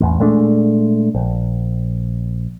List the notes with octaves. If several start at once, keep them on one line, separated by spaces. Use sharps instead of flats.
A1 E2
A#2 G#3 A3 D4
A#1